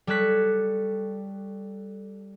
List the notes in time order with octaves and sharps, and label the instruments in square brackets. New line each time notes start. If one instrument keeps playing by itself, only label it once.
[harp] G3 A4 C#5 F#6 B6